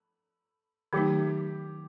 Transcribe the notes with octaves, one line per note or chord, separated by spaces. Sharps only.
D#3 F#3 A3 D#4 G4